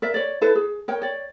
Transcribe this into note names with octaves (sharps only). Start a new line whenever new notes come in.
A#4 D5 E5
C#5 D5
E4 A4 B4
G#4
A#4 C#5 G5
C#5 D5